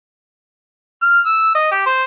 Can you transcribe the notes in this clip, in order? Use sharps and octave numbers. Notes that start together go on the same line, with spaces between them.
F6
E6
D#5
G4
C5